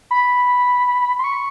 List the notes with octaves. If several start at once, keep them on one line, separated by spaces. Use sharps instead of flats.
B5
C6
C#6